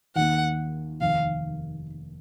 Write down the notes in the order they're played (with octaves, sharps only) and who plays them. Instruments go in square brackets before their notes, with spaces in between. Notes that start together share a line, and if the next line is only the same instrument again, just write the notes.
[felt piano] D#2 D#3 A#3 [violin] F#5
[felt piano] F1 D#2 D#3 [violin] F5